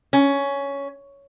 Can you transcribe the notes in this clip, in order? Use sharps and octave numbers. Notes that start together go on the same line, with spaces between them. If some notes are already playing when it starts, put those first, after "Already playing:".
C#4